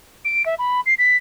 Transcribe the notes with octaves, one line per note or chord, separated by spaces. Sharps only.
D7
E5
B5
C7
B6